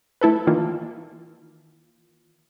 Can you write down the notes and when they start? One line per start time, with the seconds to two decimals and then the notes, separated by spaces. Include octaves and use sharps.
0.21 A3 E4 A4 B4
0.47 D#3 E3 A#3 F4